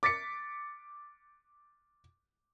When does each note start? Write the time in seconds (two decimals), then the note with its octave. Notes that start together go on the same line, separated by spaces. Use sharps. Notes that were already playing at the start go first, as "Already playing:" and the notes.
0.03 D6 A6 B6 C#7